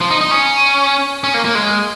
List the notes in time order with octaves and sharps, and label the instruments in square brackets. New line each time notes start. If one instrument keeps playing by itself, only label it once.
[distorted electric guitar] F3
D#4
D#4
C#4
C#4
A#3
A#3
G#3